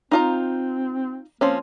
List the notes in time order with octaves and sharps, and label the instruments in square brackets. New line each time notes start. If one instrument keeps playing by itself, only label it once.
[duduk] C4 [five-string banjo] D#4 F4 A#5
[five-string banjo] F3 C4 C#4 [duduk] A#3